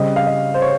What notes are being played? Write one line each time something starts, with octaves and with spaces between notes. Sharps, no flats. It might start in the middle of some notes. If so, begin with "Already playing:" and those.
Already playing: C#3 G3 C4 D#5
F5
D#5
C5
C#5